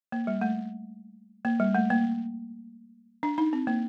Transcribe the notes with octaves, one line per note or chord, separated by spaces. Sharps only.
A#3
G3
A3
A#3
G3
A3
A#3
D4
D#4
C4
A#3